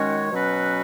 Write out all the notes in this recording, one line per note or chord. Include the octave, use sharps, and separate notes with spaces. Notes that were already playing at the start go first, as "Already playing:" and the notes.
Already playing: D#3 G#3 C#4 F#4 C#5
B2 F#3 C#4 F#4 B4